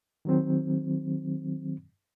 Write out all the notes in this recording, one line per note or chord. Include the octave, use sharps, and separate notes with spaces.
D#3 F#3 C4